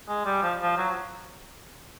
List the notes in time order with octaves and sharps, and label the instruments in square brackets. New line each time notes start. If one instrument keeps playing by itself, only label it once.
[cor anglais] G#3
G3
F3
F3
F#3